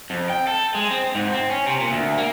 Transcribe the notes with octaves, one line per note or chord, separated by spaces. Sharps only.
F2
G5
A4
G#3
C4
G#2
C4
C#4
C3
A#2
D2
A#3